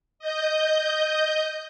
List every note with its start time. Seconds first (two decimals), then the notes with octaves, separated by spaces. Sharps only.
0.19 D#5 G6